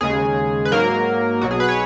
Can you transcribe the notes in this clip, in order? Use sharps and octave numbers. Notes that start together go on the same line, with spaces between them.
D#2 C#3 G#3 G#4
B4
G#2 F#3 A#3 A#4
B1 B2 F#3 F#4
G#4
B4
C#5